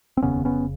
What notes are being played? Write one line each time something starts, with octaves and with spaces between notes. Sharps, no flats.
C4
F1 D#2 C#3 B3 C#4
B3 C#4